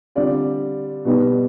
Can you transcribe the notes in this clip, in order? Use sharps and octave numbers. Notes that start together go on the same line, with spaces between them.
D3 G3 C4 F4 D5
B2 G3 B3 D#4